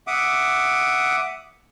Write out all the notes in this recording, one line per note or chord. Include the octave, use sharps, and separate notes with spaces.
E5 F#5 D6 D#6